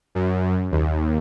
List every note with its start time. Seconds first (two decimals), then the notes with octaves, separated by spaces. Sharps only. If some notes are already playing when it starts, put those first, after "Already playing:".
0.15 F#2
0.72 D#2